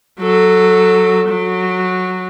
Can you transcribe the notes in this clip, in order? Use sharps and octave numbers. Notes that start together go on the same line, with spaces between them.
F#3 A4
F#3